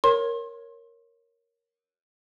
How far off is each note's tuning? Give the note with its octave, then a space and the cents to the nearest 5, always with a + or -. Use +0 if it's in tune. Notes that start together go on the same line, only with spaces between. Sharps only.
A#4 +0 C#5 -5 C6 +30